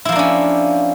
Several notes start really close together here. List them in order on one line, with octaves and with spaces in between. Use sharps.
E4 F3 A#3 D4 C#4